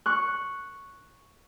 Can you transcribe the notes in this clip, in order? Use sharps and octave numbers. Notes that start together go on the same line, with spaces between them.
C#6 F#6